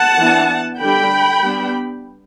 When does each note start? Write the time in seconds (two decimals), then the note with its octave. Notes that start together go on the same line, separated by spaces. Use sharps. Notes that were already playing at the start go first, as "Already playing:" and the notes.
Already playing: F#5 A5
0.20 E3 B3 D4
0.81 D3 G3 D4 G5 B5
1.43 G3 B3 D4